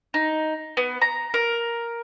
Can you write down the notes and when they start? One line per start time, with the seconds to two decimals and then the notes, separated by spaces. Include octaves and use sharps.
0.14 D#4
0.77 B3
1.01 A#5
1.34 A#4